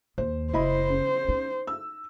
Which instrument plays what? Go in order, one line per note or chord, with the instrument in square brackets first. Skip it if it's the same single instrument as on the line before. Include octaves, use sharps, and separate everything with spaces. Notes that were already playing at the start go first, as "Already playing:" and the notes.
[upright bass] D#2 [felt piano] C5
[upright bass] F#1 [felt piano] E4 D#5 B5 [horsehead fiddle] C5
[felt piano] C#3
[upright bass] D#4
[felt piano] E6